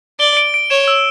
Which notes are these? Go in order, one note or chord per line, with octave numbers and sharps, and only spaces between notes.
D5 G7
D7
D7
C#5 E7
E6